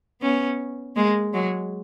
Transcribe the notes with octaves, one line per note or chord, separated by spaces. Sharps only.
B3 C#4
G#3 A#3
F#3 G#3